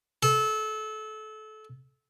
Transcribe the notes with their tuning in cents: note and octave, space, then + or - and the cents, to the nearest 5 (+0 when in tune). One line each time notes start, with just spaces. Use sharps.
A4 -25